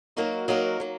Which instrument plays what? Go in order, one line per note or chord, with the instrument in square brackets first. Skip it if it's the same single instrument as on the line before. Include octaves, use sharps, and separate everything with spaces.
[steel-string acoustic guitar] F#3 A#3 D#4 F#4 A#4
F#3 A#3 D#4 F#4 A#4
F#3 A#3